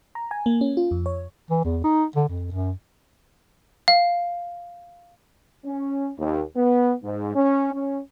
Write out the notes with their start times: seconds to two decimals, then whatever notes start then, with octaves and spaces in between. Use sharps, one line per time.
0.15 A#5
0.31 G#5
0.46 A#3
0.61 C#4
0.77 F4
0.91 F2
1.06 C#5
1.51 E3
1.64 E2
1.84 D#4
2.16 D3
2.29 F2
2.52 F#2
3.88 F5
5.66 C#4
6.18 D#2
6.57 B3
7.04 G#2
7.36 C#4
7.74 C#4